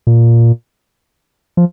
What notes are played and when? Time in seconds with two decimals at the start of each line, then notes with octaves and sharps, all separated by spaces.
0.07 A#2
1.57 F3